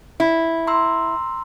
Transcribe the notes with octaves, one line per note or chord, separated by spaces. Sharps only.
E4
A#5 C6 E6